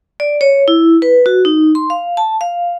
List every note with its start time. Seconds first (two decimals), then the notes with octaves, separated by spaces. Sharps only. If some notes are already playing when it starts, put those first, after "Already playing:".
0.20 D5
0.41 C#5
0.68 E4
1.02 B4
1.26 F#4
1.45 D#4
1.75 C6
1.90 F5
2.17 A5
2.41 F5